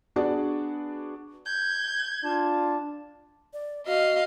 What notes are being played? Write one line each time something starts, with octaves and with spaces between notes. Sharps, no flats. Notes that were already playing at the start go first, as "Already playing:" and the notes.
B3 D4 F#4 G#4 D5
G6 G#6
D4 F4 A5
D5
F#4 D#5 F5